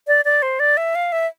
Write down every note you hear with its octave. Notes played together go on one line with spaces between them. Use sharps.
D5
D5
C5
D5
E5
F5
E5